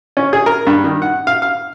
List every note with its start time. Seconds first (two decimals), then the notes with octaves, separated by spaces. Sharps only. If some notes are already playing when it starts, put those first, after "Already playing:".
0.17 C#4
0.33 G#4
0.46 A#4
0.67 G2
0.84 D#3
1.02 F#5
1.27 F5
1.42 F5